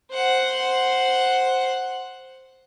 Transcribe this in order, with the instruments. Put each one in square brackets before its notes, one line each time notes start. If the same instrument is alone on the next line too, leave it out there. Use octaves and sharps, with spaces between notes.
[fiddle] C5 F#5